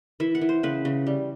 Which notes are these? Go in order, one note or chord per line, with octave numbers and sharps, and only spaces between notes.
E3 E5
F#5
E3
C5
C#3 B4
C#3
G3